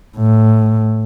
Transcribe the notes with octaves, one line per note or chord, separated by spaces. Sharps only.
A2